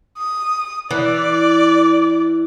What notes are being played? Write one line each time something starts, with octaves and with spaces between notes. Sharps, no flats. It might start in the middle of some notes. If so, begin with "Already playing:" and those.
D#6
E3 D5